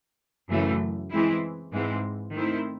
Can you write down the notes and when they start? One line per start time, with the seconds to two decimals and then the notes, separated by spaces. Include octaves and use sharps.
0.49 F#2 C#3 E3 A3
1.10 E3 G#3 C4 E4
1.72 G#2 E3 G#3 C4
2.34 D#3 A3 C4 E4 C5